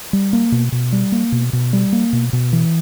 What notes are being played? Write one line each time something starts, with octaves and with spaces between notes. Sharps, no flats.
G3
A#3
B2
B2
G3
A#3
B2
B2
G3
A#3
B2
B2
E3